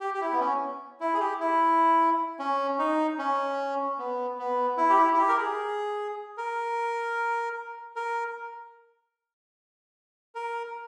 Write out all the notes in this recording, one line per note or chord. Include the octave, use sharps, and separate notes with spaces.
G4
G4
E4
B3
C#4
E4
G#4
G4
E4
C#4
D#4
C#4
B3
B3
E4
G4
E4
E4
G4
A#4
G#4
A#4
A#4
A#4